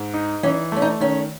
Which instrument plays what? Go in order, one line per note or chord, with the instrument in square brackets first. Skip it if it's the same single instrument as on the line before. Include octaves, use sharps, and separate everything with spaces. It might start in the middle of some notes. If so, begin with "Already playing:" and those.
Already playing: [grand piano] G#2
D#4
[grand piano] E3 [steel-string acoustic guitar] C#4
[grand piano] A3 [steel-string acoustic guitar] C#4
[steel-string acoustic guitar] D#4
[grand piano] D#3 [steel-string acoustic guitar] C#4